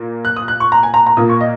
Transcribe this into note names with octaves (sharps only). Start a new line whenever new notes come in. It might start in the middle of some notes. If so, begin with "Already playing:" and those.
Already playing: A#2 A#3
F#6
D#6
F#6
C#6
A#5
G#5
A#5
A#5
A#2 A#3 D#6
C#6
D#5